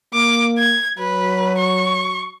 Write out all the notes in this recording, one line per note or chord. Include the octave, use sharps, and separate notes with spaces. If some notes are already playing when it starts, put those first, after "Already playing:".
A#3 D6
G#6
F#3 B4
C#6